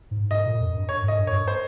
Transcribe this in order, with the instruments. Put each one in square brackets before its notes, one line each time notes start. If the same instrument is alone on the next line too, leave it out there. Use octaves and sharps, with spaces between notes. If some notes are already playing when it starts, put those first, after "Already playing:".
[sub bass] G#2
[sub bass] G#2 [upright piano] D#5
[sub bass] A#2
F2
G2
[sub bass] G2 [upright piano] C#5
[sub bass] G#2
[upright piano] D#5
[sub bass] G2
[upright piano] C#5
[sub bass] G2
[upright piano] C5